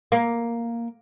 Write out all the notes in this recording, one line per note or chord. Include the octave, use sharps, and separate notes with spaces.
A#3